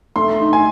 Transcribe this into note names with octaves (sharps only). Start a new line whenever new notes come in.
A3 C6
D#4
G#5